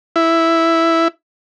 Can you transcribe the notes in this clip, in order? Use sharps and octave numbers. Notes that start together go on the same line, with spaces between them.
E4